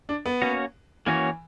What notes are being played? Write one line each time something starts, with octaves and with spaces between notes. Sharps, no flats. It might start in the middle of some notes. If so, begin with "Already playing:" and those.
D4
B3
A#3 C#4 F#4 C#5
E3 A#3 C#4 F#4 C#5